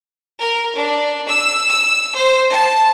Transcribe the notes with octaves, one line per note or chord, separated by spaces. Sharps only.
A#4
D4
E6
E6
C5
A5